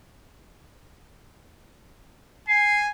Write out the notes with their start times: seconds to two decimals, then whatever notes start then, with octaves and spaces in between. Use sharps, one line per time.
2.48 G#5 C7